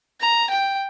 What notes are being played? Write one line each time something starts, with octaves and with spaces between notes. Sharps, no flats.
A#5
G5